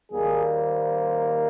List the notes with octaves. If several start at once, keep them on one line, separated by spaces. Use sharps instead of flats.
D#2 D#3 G3 A#3 G#4
C5